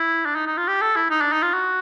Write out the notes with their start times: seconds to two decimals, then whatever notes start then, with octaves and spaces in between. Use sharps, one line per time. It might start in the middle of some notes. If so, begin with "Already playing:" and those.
Already playing: E4
0.26 D4
0.35 D#4
0.46 D#4
0.57 F4
0.68 G4
0.82 A4
0.96 E4
1.10 D#4
1.21 D4
1.32 D#4
1.42 F4
1.54 F#4